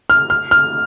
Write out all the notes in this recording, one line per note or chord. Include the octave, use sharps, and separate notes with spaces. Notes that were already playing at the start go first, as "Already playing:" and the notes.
F6
F6
F6